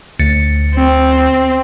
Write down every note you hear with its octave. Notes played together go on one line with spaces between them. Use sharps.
D2 A6 C#7
C4